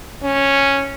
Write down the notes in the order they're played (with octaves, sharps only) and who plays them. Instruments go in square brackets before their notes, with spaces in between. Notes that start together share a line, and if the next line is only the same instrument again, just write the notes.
[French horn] C#4